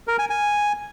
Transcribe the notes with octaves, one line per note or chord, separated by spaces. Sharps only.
A#4
G#5
G#5